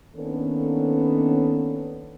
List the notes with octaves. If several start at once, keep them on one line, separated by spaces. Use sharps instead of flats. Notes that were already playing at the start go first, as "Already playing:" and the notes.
D#3 A#3 B3 C#4 D4 A4